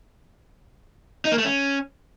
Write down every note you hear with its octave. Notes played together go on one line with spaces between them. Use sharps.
D#4
A#3
A3
C#4